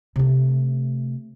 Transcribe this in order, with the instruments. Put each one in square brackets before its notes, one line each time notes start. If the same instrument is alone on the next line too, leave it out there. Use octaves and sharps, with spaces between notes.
[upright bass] C3 A3